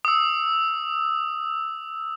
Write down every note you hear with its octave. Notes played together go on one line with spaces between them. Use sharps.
D#6 E6